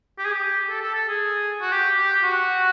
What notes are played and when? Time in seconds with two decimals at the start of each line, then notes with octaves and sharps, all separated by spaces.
0.18 G4
0.25 G#4
0.33 G4
0.70 A4
0.82 A4
0.95 A4
1.08 G#4
1.61 F#4
1.72 G4
1.97 G4
2.23 F#4